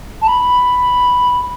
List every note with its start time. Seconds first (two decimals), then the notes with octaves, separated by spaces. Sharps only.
0.22 A5
0.27 B5